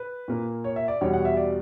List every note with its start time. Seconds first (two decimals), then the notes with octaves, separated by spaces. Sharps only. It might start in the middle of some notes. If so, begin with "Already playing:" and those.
Already playing: B4
0.28 A#2 A#3
0.64 C#5
0.76 E5
0.88 D5
1.01 E2 B2 G3 C#5
1.13 F#5
1.25 E5
1.37 D5